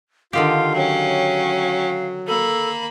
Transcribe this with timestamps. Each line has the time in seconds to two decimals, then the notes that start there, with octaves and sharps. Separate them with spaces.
0.33 D3 D#3 F4 G4 F5
0.74 F#3 C#4 G5
2.27 A#3 A4 B5